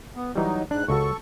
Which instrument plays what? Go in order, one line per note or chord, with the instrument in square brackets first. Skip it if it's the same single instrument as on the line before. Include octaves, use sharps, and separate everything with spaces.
[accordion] B3
[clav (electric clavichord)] E3 G3 [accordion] F#3 D#4
[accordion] G#2 F#6 [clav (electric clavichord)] D4
[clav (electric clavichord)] C#2 C#3 F#4 [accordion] A4 C#6